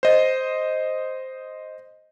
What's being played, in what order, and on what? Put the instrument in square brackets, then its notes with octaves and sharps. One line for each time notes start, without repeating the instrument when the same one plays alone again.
[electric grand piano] C5 D#5